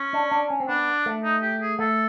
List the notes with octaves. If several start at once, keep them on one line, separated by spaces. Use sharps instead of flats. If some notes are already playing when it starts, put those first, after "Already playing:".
Already playing: C#4
D4
D4
C#4
C4
B3 D4
A3
D#4
G4
G#4
A3 A4